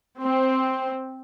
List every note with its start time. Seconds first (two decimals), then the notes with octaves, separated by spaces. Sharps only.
0.20 C4